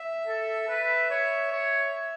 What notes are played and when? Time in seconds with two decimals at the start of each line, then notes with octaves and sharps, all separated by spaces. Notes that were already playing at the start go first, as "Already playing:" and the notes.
Already playing: E5
0.27 A4
0.68 B4
1.11 C#5
1.52 C#5